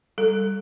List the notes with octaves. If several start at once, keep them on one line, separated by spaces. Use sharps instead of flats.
G3 A4